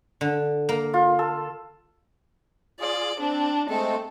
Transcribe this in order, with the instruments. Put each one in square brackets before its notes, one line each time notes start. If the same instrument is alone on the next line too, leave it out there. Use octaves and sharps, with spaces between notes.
[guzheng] D3
A#3
[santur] F4
A4
[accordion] F4 G#4 [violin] D5
[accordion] C4 [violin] D4
[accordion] G#3 A3 C4 [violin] A4